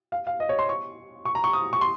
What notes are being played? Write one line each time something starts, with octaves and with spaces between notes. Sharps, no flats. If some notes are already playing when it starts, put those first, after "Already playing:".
F5
F5
D#5
C#5
C6
C#6
C#6
A#5
C#6
D#6
C#6
C6